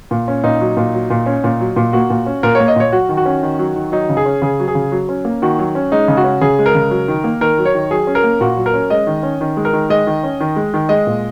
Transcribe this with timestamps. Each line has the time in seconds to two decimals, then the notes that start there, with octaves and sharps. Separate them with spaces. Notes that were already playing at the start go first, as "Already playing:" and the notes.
0.11 A#2
0.28 C#4
0.44 A#2 D#4
0.61 F#3
0.77 A#2
0.94 F#3
1.10 A#2
1.26 C#4
1.44 A#2
1.60 F#3
1.76 A#2
1.93 A#3 F#4
2.10 A#2
2.26 C#4
2.43 A#2 A#4
2.55 C#5
2.60 A#3
2.68 D#5
2.76 A#2 C#5
2.92 F#3 F#4
3.09 D#3
3.17 F#4
3.26 C#4
3.43 D#3
3.59 F#3
3.76 D#3
3.92 F#3 D#4
4.09 C#3
4.17 G#4
4.26 C#4
4.42 C#3 G#4
4.59 F#3
4.68 G#4
4.75 C#3
4.92 F#3
5.09 C#4
5.25 A#3
5.42 D#3 F#4
5.59 F#3
5.75 C#4
5.92 G#3 D#4
6.08 C#3
6.17 F#4
6.24 C#4
6.41 C#3 G#4
6.59 G#3
6.66 A#4
6.75 C#3
6.91 F#3
7.08 D#3
7.24 A#3
7.41 D#3 A#4
7.58 F#3
7.65 C#5
7.75 D#3
7.91 F#3 G#4
8.07 C#4
8.15 A#4
8.23 A#3
8.41 A#2 F#4
8.57 F#3
8.66 A#4
8.74 C#4
8.90 G#3 D#5
9.07 D#3
9.23 C#4
9.41 D#3
9.57 G#3
9.65 A#4
9.73 D#3
9.89 G#3 D#5
10.07 D#3
10.24 C#4
10.40 D#3
10.56 G#3
10.74 D#3
10.89 G#3 D#5
11.07 A#2